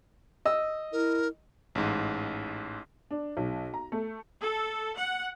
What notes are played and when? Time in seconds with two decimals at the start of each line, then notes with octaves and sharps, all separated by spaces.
0.45 D#5 E6
0.93 E4 A#4
1.75 A1 G#2
3.11 D4
3.37 B1
3.74 A#5
3.92 A3
4.42 A4
4.99 F#5